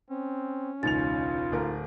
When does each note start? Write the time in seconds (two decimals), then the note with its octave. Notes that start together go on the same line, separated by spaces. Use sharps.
0.10 C4 C#4
0.83 E1 C#2 D#4 F4 A6 F7
1.52 D1 A3 A#4